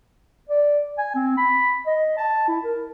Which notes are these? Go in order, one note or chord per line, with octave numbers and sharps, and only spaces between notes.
D5
G#5
C4
B5
D#5
A5
E4
A#4